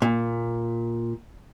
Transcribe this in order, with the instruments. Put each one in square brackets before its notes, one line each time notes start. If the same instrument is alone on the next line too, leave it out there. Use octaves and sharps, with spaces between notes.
[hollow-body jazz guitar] A#2